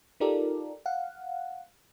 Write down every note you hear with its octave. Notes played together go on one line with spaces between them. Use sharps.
D#4 F4 G4 A4 A#4 D5
F5 F#5